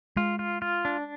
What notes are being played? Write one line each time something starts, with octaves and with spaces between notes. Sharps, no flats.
G#3 F4
F4
F4
D4